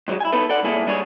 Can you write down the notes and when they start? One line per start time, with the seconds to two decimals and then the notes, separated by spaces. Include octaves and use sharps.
0.08 G#2 F#3 G#3
0.20 E4 G#5
0.32 B3 D#4 E4 A4 B4
0.49 A4 D5 F#5
0.63 C2 G#2 A#3 E4 G#4 A4
0.86 G3 G#3 D4 G#4 A#4 C#5